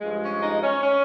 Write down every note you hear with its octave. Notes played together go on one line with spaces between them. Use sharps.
G2 F3 G#3
C#4
D#4
C#4
C#4